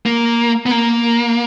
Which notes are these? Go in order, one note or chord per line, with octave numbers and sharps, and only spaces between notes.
A#3
B3
A#3